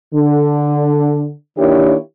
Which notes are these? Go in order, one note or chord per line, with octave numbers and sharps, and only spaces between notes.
D3
D#3 A#3 D4 E4 G4 C#5